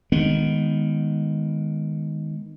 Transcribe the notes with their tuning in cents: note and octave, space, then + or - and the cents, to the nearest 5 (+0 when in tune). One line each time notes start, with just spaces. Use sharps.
D#3 +0 G#3 +0 B3 -5